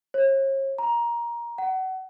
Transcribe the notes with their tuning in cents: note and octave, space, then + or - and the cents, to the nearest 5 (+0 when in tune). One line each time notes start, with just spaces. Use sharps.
C#5 -40
A#5 +15
F#5 +30